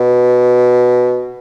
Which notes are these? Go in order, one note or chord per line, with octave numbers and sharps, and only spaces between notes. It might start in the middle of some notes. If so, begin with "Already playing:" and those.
Already playing: B2